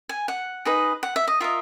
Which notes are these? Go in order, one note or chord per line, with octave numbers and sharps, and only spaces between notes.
G#5
F#5
D#4 G#4 B4 D#5
F#5
E5
D#5
F4 A#4 D#5 E5